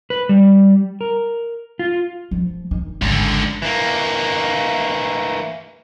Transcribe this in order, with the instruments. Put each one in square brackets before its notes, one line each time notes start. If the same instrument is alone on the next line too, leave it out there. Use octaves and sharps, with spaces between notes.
[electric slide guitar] B4
G3
A#4
F4
[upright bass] F3
D#3
[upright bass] G#1 [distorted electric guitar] C#2 D3
[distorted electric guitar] E3 A#3